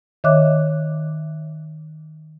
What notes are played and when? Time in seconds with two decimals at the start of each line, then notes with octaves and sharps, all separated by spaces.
0.24 D#3 C#5 D#5 E5 D6 F#6